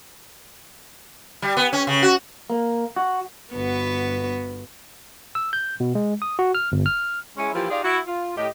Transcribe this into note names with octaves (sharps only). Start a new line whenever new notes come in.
G3
B3
C#4
C#3
F#4
A#3
F#4
G1 B3 F#4 B4
E6
G6
B2
G#3
D#6
F#4
F6
G1
F6
G#3 C#4 E4
E3 F3 A#3 E4 F4 G4
D#4 F4 G4 G#4 D5 F5
E4 F#4
F4
A2 G4 D#5